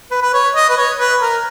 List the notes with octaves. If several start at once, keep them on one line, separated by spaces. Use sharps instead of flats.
B4
B4
C#5
D#5
B4
C#5
B4
A#4